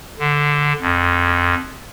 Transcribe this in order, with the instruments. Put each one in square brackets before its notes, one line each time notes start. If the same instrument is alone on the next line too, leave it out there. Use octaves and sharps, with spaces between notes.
[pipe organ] D3
F2